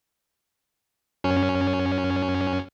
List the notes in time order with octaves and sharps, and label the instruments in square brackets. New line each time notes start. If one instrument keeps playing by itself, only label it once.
[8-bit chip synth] F#2 C#4